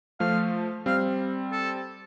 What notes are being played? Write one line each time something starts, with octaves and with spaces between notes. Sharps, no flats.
F3 A3 F5
G3 C4 F5
A4